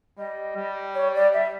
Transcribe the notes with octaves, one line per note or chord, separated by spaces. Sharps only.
G3 D#5
G3
C#5
D5
E5